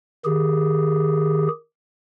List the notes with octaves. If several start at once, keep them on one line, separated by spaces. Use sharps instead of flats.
D#3 G4 G#4